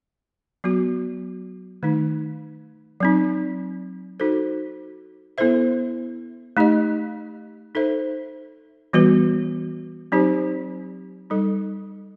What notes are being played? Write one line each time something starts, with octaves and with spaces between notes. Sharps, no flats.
F#3 B3 F#4
D#3 A3 D#4
F#3 C4 D#4
D#4 F#4 A4 C5
B3 E4 A4 C5 E5
A3 D#4 G4 D#5
D#4 A4 C5 E5
E3 G3 B3 F#4 B4
F#3 C4 D#4 G4 C5
G3 D#4 A4